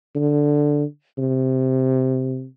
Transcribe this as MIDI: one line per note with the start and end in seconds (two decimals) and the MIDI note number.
0.15 0.84 50
1.18 2.46 48